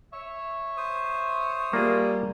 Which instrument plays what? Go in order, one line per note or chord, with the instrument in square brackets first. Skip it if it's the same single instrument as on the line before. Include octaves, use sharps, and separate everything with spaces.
[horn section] C#5 E5
[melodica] C5 D#6
[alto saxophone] G3 [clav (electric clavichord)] A#3 F4 G#4